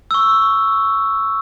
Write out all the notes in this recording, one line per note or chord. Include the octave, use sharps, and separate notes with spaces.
C#6 E6